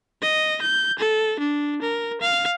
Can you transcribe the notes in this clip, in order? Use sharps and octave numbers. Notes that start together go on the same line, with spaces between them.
D#5
G6
A4
D4
A#4
F5